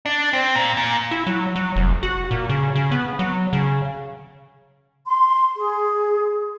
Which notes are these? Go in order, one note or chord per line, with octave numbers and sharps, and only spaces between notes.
D4
C4
A#2
A#2
E4
F#3
F#3
F1
F#4
A#2
C#3
C#3
B3
F#3
C#3
C6
G#4